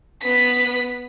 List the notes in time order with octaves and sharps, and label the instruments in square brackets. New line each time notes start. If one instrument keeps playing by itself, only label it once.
[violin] B3 B6